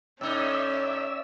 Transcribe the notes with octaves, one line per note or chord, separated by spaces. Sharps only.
A2 C#4 D#4 D5 E5 E6